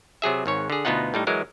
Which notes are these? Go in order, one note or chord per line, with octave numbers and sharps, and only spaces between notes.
C3 F#3 G#4 E5
G#1 G#2 C#5
D3 G#4
D2 B2 B3 D#4 F4 F#5
A2 G3 D#4
E3 F#3 G#3 A#4